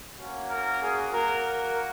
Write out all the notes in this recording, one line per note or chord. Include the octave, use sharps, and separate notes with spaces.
A#3 C#4 F#4
A#4
G#4
A#3 F#4 A#4
A#4